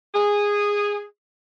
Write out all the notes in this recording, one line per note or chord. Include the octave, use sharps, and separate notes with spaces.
G#4